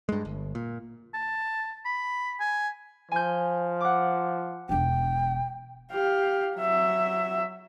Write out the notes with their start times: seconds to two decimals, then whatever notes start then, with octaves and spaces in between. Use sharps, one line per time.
0.09 G2 G#3
0.25 G1
0.55 A#2
1.14 A5
1.85 B5
2.40 G#5
3.12 F3 G#5 G6
3.80 F#5 D6
4.69 E1 D4 G5
5.92 G4 F5
6.57 F#3 E5